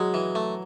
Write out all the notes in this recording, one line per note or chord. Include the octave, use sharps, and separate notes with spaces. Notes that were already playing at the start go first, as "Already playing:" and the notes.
Already playing: F#3 G#3
E3
A3